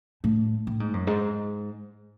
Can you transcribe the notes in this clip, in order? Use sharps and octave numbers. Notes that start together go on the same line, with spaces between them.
A2
A2
G#2
F#2
G#2